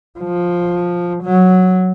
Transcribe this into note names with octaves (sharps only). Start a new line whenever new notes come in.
F3
F#3